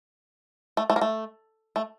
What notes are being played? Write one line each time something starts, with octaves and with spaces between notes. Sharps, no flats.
A3
A3
A#3
A3
A3